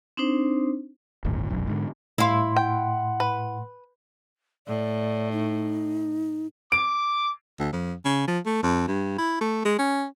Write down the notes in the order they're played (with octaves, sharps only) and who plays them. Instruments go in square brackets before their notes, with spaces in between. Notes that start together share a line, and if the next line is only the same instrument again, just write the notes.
[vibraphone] C4 D4 D#4 C5
[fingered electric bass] D1 G1 D#2 A2
F1 B1 F#2
G#2 D3
[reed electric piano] A2 C6 [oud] E4 F5
[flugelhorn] F#5 [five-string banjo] G5
[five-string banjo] B4
[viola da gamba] A2 [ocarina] D5
[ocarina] D#4
[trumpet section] D6 [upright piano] D7
[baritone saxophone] D2
F2
C#3
F3
A3
F2
G2
E4
A3
G#3
C#4